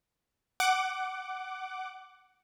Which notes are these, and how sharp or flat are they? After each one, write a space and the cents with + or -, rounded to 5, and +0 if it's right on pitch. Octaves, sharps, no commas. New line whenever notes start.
F#5 +15 D6 +0